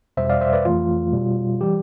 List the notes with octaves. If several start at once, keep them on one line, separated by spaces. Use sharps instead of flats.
E2 B2 G3 C5 E5
D5 F5
C5 E5
B4 D5
F2 E3 A3 F4
B2 G3
E3 G3 G4